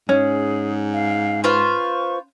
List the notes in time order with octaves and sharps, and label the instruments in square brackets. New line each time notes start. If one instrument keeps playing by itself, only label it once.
[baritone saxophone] G#2 [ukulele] C#4 [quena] G#4
[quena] F5
[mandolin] F4 B4 C5 [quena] C#6